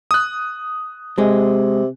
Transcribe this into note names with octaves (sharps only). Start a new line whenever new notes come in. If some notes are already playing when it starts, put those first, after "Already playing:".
D#6 F#6
C3 G#3